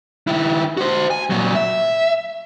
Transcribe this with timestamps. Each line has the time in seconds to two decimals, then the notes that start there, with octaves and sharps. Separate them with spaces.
0.27 D#3 E4
0.77 F#4 C5
1.11 G#5
1.30 A#2 F#3
1.55 E5